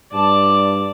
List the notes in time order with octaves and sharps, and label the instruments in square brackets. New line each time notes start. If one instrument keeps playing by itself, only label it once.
[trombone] G2 [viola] D5 A5